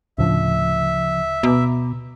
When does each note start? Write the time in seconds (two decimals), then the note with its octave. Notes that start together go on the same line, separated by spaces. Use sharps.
0.18 D1 A2 C#3 F3 D4 E5
1.43 B2 A#5 B5 D6